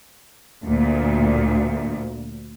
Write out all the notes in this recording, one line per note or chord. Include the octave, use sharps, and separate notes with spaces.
D2 A#2